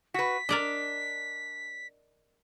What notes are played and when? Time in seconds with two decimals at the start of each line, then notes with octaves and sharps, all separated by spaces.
0.14 F#4 B4 B6
0.49 D4 A#4 D5 D#5